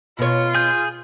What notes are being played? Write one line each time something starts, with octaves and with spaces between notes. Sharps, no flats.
B2 F4 C#5
G#4 G6